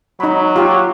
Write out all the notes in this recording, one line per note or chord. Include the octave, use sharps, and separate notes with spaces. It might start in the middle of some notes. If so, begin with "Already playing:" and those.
F#3 D#4 B5
F4 G4